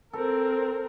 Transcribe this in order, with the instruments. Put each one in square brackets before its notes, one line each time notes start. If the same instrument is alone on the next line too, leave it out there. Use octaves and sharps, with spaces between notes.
[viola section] C4 A#4 [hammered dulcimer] A4